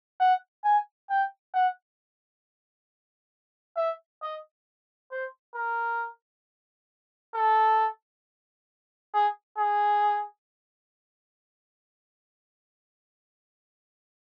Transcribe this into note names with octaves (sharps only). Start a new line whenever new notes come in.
F#5
G#5
G5
F#5
E5
D#5
C5
A#4
A4
G#4
G#4